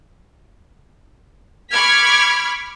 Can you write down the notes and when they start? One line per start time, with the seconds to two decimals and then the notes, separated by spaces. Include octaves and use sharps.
1.72 B5 C#6 D6 F6 G#6 B6